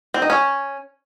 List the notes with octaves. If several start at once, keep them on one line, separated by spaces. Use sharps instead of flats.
C4
D#4
C#4